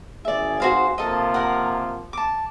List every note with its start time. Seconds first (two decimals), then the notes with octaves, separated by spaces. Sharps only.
0.25 G#1 G#4 D5 E5
0.60 F#4 C5 F5
0.98 C3 F3 A#3 A4 D#5
1.34 A#4 F#5
2.13 A5 D6